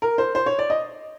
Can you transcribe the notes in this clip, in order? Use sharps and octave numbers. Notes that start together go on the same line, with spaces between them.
A#4
C5
C5
C#5
D5
D#5